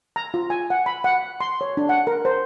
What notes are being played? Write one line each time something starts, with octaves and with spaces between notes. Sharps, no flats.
A#5
F4
G#5
F#5
B5
F#5
C6
C#5
D4
F#5
A#4
C5